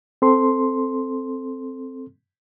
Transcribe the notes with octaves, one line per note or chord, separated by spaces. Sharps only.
C4 A4 C6